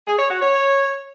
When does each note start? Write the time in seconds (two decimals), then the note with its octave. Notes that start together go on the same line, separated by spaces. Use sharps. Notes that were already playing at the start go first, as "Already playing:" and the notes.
0.07 G#4
0.18 C#5
0.30 F#4
0.42 C#5